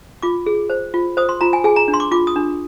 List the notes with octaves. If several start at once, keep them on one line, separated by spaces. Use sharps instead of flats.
F4 D6
G#4
C5
F4
C5 D#6
C6
F4 A#5
G#5
G#4 G#5
A#5
D4
C6
D6
F4 D6
D#6
D4